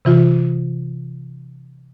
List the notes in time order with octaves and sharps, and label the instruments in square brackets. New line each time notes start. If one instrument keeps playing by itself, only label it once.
[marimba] C3 E3 F4